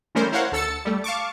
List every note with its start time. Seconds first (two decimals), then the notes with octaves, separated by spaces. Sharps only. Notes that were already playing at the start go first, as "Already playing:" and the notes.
0.15 E3 G3 A3 C#4 A#4 C5
0.32 E4 A#4 C5 C#5 F5 F#5
0.52 D2 A4 E6 A6 C#7
0.85 G3 A3
1.04 F5 A5 C#6 D6